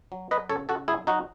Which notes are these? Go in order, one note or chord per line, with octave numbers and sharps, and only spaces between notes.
F#3
F#3 B4 D#5
C#3 A4 C#5
C#3 F#4 A4
F#3 E4 G#4
F#3 D#4 F#4